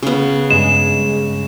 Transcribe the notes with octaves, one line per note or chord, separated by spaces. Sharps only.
C#3 B3
G2 G#3 E7